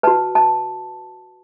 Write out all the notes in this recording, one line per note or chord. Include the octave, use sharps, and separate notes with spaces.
F#4 B4 A5
A5